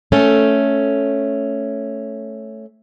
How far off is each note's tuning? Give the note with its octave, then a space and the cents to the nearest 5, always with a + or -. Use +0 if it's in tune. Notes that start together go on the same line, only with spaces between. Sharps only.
A3 +0 C#4 +0 A4 +0